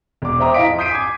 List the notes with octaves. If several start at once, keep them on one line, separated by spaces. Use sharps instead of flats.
E1 D6
C5 E5 G5 A#5 D6 D#6
E4 D#5 F5 B6 D7
F2
D#6 G6 B6 C7 D7 D#7
G#5 D6 G#6